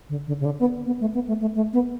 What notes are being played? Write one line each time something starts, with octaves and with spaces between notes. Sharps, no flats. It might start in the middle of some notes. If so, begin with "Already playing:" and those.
D3
D3
C#3
D3
B3
B3
A3
B3
A3
A3
A3
B3